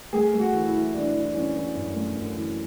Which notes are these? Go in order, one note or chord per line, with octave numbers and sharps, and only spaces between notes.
A3 G#4
A3
F#4
E3
E4
E3
E3 D4
E3
E3 C#4
E3
F#2
A3
F#2
E3